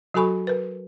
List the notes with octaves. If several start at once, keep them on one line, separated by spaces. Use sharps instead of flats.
F#3 F#4 A4 G#5 B5 C#6
A#4 B4